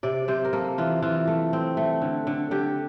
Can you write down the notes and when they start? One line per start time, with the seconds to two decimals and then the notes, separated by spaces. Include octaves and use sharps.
0.03 C3 D5
0.28 C3 C5
0.45 A#4
0.53 A#3 A4
0.78 E3 F4
1.02 E3 F4
1.28 A3
1.53 C4
1.77 A3
2.02 D3
2.27 D3
2.51 D3 G4